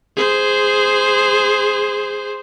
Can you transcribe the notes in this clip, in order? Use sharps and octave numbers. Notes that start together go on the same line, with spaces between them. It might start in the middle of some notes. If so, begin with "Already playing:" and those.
G#4 C5